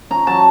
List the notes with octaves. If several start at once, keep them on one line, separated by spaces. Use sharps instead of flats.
C#4 A#5
F#3 A5